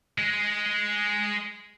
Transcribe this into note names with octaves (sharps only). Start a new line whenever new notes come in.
G#3 G#4